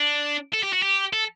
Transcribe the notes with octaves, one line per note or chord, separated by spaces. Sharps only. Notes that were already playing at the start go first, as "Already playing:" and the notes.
Already playing: D4
A4
G4
F#4
G4
A4